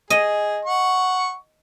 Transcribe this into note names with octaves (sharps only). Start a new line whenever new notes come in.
G#4 D#5
F#5 C#6